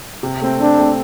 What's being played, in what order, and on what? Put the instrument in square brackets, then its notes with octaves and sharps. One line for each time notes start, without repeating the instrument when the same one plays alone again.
[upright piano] C3
A3 C4
[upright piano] C3 [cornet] D4
[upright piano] A3 C4